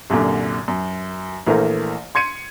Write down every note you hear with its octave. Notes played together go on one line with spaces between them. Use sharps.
C2 F#2 A#2 D3
F#2
A#1 E3 A3 A#4 C5
C6 G#6 C#7 D#7